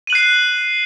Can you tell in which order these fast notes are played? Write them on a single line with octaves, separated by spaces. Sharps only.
D#7 F#7 F#6 C7